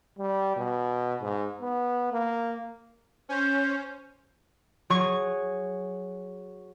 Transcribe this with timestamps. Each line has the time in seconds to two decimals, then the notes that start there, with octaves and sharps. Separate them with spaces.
0.18 G3
0.56 B2
1.21 G#2
1.61 B3
2.12 A#3
3.29 C#4 C5
4.90 F#3 G#4 C#6 G#6